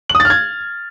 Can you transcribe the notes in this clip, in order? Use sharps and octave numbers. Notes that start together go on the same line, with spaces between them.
F#7
D#6
A6
F6
G#6